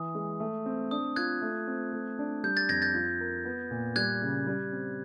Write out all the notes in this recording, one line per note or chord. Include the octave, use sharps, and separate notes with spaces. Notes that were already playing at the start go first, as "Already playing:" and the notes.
Already playing: E3 D#6
G#3
A3
C4
D4 D#6
F4 F#6 G#6
A3
C4
A3
D4
G3 G6
G6 A6
F2 G#6 A#6
G6 A6
F4
A#4
B3
A#2
G3 F#6 G#6
C#3
G3
C4